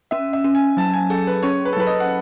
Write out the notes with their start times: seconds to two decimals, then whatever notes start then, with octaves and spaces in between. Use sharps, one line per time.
0.11 C#4 E5
0.33 E5
0.44 C#4
0.55 G#5
0.77 F#3 A5
0.94 G#5
1.10 G#4 A4
1.27 B4
1.43 C#4 C#5
1.65 B4
1.73 A4
1.77 F#3 B4
1.87 D#5
2.00 F#5